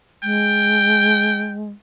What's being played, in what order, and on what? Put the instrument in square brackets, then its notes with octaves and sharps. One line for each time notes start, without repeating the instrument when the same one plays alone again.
[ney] G#3 [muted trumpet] G5